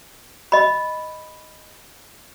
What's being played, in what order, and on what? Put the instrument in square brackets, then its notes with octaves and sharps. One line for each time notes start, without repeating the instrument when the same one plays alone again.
[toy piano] D#5 B5